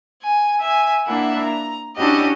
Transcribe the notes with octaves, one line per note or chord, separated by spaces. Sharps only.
G#5
E5 G#5
A#3 D4 E4 E5 F#5
A#5
C#4 D4 E4 F#4 G4 D#5